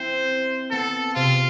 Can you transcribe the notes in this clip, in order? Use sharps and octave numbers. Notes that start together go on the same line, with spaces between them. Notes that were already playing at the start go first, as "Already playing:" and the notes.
Already playing: C4 E4 C5
B3 A4
C3 F4